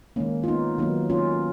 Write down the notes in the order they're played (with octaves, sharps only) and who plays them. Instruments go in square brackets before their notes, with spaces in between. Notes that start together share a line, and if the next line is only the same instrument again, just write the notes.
[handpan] D#3 G#3 A#3 C#4
F4
B3 D#4
D#3 F#3 A#3 B3 D#4
C#4 F4